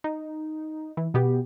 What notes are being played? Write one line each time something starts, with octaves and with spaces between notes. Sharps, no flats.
D#4
E3
B2 B3 G4